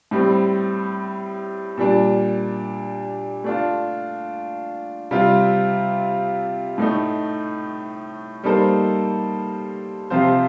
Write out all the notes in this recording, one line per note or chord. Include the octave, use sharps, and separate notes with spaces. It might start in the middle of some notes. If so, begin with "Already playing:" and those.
A2 G3 C4
A#2 G3 D4
A3 D4 F4
C3 G3 C4 F4
A2 A3 D#4
G3 A#3 D#4 A4 C5
C3 F3 C4 F4 C5